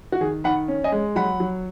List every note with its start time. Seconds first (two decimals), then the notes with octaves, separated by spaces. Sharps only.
0.12 F#4
0.21 D#3 G#4
0.44 D#3 F#5 B5
0.68 C#4
0.84 D#5 G#5
0.92 G#3
1.16 F#3 F#5 B5
1.40 F#3